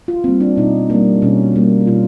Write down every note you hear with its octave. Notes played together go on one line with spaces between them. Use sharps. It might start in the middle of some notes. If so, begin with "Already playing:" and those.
F4
G3 A#3 C4
D4
B2 D#4
G3 A#3 D4
B2 C#4
G3 A#3
B2 F4